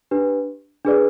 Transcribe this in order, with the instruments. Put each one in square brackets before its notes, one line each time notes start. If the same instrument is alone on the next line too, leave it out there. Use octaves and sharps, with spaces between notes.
[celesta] D4 G4 B4
D4 G#4 B4 D5